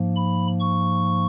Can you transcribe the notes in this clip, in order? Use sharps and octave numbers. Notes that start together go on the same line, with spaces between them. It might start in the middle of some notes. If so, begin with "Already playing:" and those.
Already playing: G#2 F3 A#3
B5
C#6